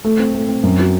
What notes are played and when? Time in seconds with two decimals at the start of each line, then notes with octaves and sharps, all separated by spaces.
0.04 A3
0.19 C4
0.35 A3
0.49 C4
0.63 F#2
0.80 F#4